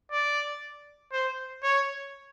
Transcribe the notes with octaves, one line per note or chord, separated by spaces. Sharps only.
D5
C5
C#5